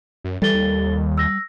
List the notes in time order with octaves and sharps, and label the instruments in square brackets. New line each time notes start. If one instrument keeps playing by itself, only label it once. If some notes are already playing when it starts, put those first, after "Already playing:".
[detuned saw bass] F#2
[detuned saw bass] E3 [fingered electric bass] G3 [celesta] A4 A6 G7
[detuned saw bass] D#2
[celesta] E6 A#6